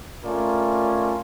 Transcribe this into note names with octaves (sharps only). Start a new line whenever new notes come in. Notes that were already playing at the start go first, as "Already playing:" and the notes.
A3 C#4 F4 A#4 D5